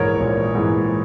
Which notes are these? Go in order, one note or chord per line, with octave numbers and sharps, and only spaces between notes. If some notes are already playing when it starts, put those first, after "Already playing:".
Already playing: A#1 G#2 E3 A#4 C#5
A#1
G#2 E3